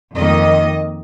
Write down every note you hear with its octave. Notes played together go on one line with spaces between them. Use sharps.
F2 D#3 A#3 D#5